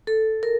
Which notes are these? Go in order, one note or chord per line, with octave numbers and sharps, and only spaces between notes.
A4
A#4